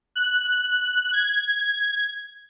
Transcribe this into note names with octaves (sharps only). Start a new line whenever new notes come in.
F#6
G#6